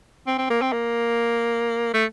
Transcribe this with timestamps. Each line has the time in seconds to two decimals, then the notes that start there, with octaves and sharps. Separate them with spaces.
0.27 C4
0.38 C4
0.50 A#3
0.62 C4
0.73 A#3
1.94 A3